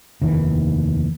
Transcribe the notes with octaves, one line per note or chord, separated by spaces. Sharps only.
F1 D#2 D#3 E3